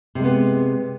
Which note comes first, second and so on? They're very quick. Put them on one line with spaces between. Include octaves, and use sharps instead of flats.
C3 G#3 B3